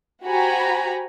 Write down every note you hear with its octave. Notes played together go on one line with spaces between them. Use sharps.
F#4 G4 C5 G#5 A#5 B5